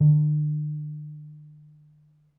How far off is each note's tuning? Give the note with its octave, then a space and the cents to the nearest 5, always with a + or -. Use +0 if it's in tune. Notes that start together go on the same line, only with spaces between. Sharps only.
D3 +45